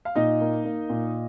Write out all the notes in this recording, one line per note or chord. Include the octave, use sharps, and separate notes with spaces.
F5
A#2 D#4 D#5
A#3
A#3
A#2